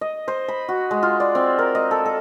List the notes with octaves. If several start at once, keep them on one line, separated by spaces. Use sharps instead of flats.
D#5
C5
B5
F#4
G#3
F4
D5
C4
A#4
D#5
A4
A4